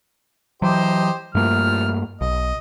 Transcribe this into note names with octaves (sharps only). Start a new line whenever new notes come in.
E3 F#3 G4 C5 D#5
G2 F3 A3 A#3 F6
B1 D#5